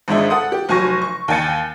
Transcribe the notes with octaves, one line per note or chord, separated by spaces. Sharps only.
G#1 G#2 G#3 D4 E5
A4 F#5 D#6
G4
F1 F#3 G#5 C#6 A#6
C#6
D#2 G5 G#5 A6 C#7